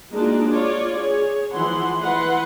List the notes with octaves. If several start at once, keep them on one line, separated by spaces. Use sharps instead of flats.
G#3 A#3 D4 D#4 F4 F#4
F4 C#5 D5
G#4 C#5
E3 F3 F#5 C6
E3 B4 F#5 C6